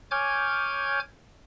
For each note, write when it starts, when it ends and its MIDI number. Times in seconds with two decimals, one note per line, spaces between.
0.11 1.00 73
0.11 1.00 80
0.11 1.00 86
0.11 1.00 89
0.11 1.00 91
0.11 1.00 92